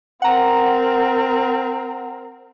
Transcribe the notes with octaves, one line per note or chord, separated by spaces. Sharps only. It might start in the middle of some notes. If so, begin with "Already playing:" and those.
C4 A#4 F#5 A#5